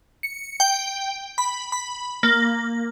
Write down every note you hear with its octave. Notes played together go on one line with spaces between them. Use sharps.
C#7
G5
B5
B5
A#3